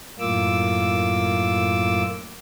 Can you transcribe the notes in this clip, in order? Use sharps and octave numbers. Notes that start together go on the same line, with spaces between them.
F#2 A2 A#3 F4 D6 E6